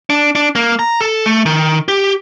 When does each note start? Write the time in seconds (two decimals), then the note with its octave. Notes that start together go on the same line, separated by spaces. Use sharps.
0.10 D4
0.35 D4
0.55 A#3
0.79 A#5
1.01 A4
1.26 A3
1.46 D#3
1.88 G4